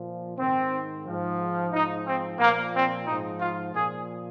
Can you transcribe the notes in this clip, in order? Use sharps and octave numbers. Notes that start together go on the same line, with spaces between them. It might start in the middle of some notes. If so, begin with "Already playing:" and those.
Already playing: A#2 F3
G#2 D#3 C4
G#2 F3
G#2 F3 D#4
C4
A#2 F3 A#3
C4
G#2 F3 D#4
F4
A#2 F3 G#4